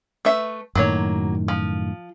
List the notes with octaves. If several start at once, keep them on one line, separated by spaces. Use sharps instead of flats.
A3 B4 E5
F#2 A2 D#3 F#3 A#3 C#5
F3